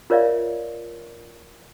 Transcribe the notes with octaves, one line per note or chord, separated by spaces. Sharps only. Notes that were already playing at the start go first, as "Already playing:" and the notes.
F4 A#4 C#5 D5 E5 F5